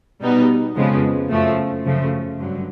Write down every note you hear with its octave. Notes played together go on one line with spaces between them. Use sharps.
B2 G3 B3 D#4
F2 C#3 F3 G#3 B3
F#2 C#3 F3 A3
F#2 C#3 F3 A3
G2 D3 F#3